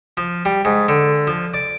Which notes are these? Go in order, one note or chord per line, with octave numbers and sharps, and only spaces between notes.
F3
G3
G#2
D3
F3
D5